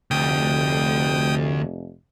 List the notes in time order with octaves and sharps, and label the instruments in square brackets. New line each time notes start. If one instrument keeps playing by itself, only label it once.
[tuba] F1 [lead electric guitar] D2 [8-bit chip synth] G5 D#6